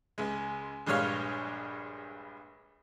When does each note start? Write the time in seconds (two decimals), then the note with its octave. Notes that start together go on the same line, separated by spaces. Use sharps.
0.18 C#2 G#3
0.86 A#1 G2 G3 G#3 C#5 F5